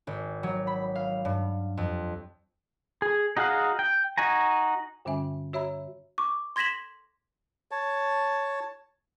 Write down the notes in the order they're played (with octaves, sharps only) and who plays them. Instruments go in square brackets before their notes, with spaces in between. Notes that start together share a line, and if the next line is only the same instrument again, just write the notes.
[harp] G#1
F#3
B5
F5
G2
F2
[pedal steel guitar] G#4
D#4 F#4 G#4 F5 F#5
G5
D#4 F#4 G#5 A#5
[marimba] G2 D3 G3 C#4 E5 G#5
F#4 C#5 E5 A#5 B5 E6
[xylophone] C#6 D6
C6 G#6 A#6 B6 E7 F#7
[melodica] C#5 A5